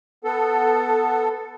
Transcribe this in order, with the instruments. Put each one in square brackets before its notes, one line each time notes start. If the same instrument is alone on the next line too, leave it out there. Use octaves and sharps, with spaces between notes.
[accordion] B3 A4